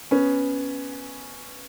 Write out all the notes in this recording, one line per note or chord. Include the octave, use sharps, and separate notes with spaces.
B3 C#4